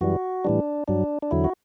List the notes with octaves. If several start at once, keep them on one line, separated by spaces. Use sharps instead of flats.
F#2 E3 G3 F#4
A2 E3 G3 D4
G2 F#3 D4
D4
E2 D3 F#3 E4
F#4